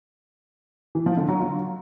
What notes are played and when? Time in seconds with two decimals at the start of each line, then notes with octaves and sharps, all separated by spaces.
0.95 E3
1.06 F3
1.17 D3
1.28 F#3
1.40 F4